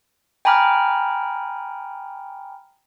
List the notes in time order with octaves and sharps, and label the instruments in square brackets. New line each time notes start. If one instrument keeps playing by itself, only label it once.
[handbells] G5 G#5 A#5 B5 D6 F6